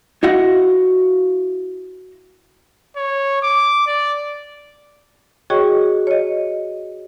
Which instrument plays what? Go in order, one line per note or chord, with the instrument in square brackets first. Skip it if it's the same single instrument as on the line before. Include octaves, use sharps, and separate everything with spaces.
[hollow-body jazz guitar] E4 F#4 D#5 F5 F#5
[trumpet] C#5
D6
D5
[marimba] F#4 G#4 C#5 D#5 G5 C#6
C#5 D#5